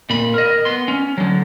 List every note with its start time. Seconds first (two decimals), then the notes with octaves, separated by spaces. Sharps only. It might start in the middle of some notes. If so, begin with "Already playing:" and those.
0.10 A#2 B5
0.34 A#4 D#5
0.65 B3 C6
0.88 C#4
1.18 D3 F#3